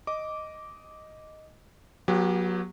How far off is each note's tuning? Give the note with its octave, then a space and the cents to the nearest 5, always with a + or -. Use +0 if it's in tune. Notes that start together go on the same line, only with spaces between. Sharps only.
D#5 +0 D6 -10
F#3 -20 B3 -45 G4 +15